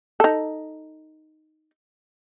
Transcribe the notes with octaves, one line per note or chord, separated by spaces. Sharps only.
D#4 A4